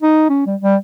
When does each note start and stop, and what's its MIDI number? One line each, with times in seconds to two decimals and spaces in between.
0.03 0.28 63
0.29 0.44 61
0.46 0.55 55
0.61 0.75 55